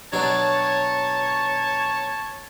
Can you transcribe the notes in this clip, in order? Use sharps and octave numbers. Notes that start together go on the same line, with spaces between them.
B2 F#3 D4 C#5 A5